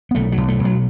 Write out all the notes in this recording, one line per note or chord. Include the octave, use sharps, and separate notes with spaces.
B3
B1 A3
F#3
B1
A3
B1
F#3